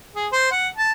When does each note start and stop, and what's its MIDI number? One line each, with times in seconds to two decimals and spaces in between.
0.15 0.27 68
0.32 0.47 72
0.52 0.68 78
0.77 0.92 81